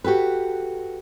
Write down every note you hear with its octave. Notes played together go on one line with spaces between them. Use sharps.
F#4 G4 A4 B4